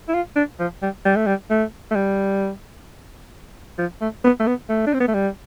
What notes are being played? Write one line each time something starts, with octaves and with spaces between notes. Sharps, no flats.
E4
F4
D4
F3
G3
G3
A3
G3
A3
A3
G3
F3
A3
B3
A3
B3
A3
D4
C4
B3
A3
G3